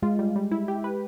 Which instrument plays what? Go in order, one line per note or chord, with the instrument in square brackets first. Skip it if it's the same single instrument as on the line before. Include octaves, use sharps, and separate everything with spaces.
[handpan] G#3 [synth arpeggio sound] F4
[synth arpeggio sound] G3
G3
E4
G4
B4